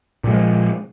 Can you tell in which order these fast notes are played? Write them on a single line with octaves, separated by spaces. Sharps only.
A#2 G3 G#3 F3